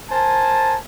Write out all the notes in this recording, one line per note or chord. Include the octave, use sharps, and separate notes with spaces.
A#4 C5 G#5 A5